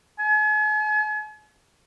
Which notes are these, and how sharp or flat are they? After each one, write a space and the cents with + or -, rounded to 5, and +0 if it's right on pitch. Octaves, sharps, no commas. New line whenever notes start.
G#5 +40